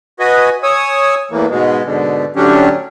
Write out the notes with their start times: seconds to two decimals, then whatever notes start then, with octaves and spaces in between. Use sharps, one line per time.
0.19 F#4 B4 D#5 G#5
0.63 C#5 G#5 D#6 E6
1.31 E2 A2 E3 A#3
1.50 G#2 B2 G#3
1.85 G#2 B2 D3
2.36 A2 D3 F#3 C#4 D4 G4